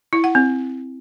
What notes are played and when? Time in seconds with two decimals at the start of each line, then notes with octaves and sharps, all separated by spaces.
0.13 E4
0.24 F#5
0.35 C4